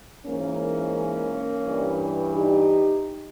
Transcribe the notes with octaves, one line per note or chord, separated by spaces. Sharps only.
G#2 E3 A#3 C#4
G2 E3
D#4 G4